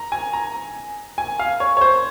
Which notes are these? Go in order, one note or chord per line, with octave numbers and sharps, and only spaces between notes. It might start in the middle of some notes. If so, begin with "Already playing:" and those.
Already playing: A#5
G#5
A#5
G#5
F5
C#5
C#5
C5